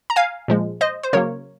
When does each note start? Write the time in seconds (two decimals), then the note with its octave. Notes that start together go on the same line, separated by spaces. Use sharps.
0.10 A#5
0.16 F5 G#5
0.48 A#2 F3 G#3
0.81 C5 D#5
1.03 C5
1.13 C#3 F#3 A#3 A#4 C#5